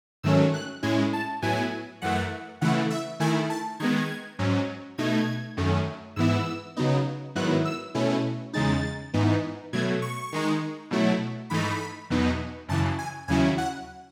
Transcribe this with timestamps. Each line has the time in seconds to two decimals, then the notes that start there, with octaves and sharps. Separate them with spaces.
0.23 G#2 D#3 F#3 A3 C#4 E6
0.54 F#6
0.83 A2 G#3 C#4 E4 G#6
1.13 A5
1.42 A2 F#3 B3 E4 G#5
2.02 F#2 E3 A3 F#5
2.61 C#3 E3 A3 E4 F#5
2.90 E5
3.20 D#3 A3 E4 G#5
3.50 A5
3.80 D#3 G#3 B3 G#6
4.39 G#2 F#3 C#4
4.98 B2 A3 D#4 G#6
5.57 F#2 D#3 A3 C#4
6.16 G#2 E3 B3 E4 E6
6.76 C#3 F#3 B3 D#4
7.35 G#2 D#3 F#3 B3 E4 F#6
7.65 E6
7.95 B2 A3 C#4 E4
8.53 E2 C#3 G#3 D#4 A6
9.13 G#2 E3 B3 D#4
9.73 B2 F#3 A3 G#6
10.02 C#6
10.32 D#3 G#3 D#4
10.91 B2 F#3 A3 E4
11.50 G#2 E3 A3 D#4 B5
12.10 E2 B2 F#3 B3 D#4
12.68 F#2 C#3 E3 A5
12.99 G#5
13.28 D#2 C#3 F#3 C#4 E4 G#5
13.58 F#5